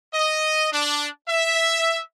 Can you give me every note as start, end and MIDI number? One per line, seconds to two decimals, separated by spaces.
0.14 0.68 75
0.73 1.09 62
1.29 2.02 76